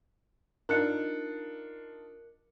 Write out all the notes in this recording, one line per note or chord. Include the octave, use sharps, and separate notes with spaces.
D4 D#4 F4 A#4 F#6 C#7